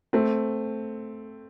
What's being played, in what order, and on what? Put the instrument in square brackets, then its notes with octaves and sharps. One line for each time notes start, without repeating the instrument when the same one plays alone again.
[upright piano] A3 C4